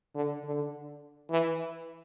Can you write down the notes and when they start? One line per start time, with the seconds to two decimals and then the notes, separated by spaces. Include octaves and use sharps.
0.15 D3
0.44 D3
1.30 E3